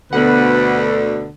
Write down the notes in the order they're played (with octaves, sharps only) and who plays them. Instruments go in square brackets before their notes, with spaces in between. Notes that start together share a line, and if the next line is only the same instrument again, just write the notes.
[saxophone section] D2 B2 D3 [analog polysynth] B3 F#5 [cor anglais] B4